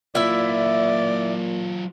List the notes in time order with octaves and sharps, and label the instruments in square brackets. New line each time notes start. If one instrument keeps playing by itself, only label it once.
[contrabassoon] A#2 [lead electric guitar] F#3 F4 [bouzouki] E4 E5 [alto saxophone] D5